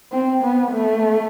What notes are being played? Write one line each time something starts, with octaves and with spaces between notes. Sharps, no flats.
C4
B3
A3